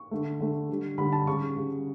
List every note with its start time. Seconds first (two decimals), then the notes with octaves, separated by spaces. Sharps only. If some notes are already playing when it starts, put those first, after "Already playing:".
Already playing: C#6
0.11 D3 A3
0.40 D3 A3
0.69 D3 G3
0.98 D3 G3 B5
1.13 A5
1.27 C#3 G3 C#6
1.56 C#3 G3